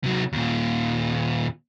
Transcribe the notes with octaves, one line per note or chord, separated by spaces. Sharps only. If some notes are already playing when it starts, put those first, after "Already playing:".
C3 F#3
D#2 A#2